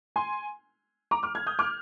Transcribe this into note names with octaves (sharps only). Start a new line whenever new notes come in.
G#5 C6
A#5 D6
D6 F6
F6 G#6
D#6 G6
D6 F6